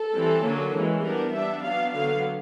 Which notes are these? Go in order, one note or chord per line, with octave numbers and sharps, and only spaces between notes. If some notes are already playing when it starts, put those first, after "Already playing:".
Already playing: A4
E3 G3 C4
D3 F#3 A#3 C#4
E3 G#3 C#4
G3 B3 D4 A#4
G3 B3 D4 E5
F#3 B3 D4 F5
D3 F#3 B3 F5